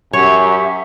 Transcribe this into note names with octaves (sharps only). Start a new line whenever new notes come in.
F#2 G4 C#5 E5